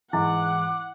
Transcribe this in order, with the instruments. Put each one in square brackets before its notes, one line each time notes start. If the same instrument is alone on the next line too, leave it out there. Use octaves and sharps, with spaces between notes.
[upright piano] G#2 E3 [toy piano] E4 [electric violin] F#5 [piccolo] D6